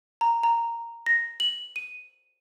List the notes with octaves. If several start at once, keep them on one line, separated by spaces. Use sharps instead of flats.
A#5
A#5
A#6
F#7
D#7